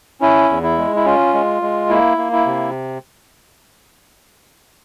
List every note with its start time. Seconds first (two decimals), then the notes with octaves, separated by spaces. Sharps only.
0.21 C#4 E4
0.50 E2
0.63 E4
0.78 G#3
0.96 E4
1.05 C#4 F4
1.34 G#3
1.62 G#3
1.89 A#3 E4
2.18 A#3
2.32 E4
2.46 C3